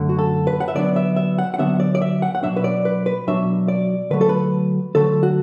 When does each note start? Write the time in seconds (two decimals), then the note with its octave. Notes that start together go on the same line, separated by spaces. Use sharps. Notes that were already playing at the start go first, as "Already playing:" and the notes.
Already playing: F#2 D3 A3
0.09 F#4
0.19 A4
0.47 B4
0.60 F#5
0.68 E5
0.74 D3 F#3 B3 D4 D5
0.96 E5
1.16 E5
1.38 F#5
1.54 F#5
1.58 D3 F#3 B3 D4 E5
1.80 D5
1.95 D5
2.02 E5
2.22 F#5
2.35 F#5
2.43 B2 F#3 D4 E5
2.56 B4
2.64 D5
2.85 B4
3.06 B4
3.27 B2 F#3 D4 E5
3.68 D5
4.10 D3 F#3 A3 B4
4.21 A4
4.29 B4
4.95 D3 F#3 A3 A4
5.23 F#4